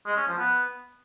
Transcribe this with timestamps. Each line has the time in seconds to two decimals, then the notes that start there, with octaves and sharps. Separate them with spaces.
0.06 G#3
0.17 C#4
0.27 F3
0.38 B3